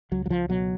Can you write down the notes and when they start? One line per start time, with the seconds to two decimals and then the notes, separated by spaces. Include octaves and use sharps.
0.11 C#2 F#3
0.26 F#3
0.30 F3
0.49 B2 F#3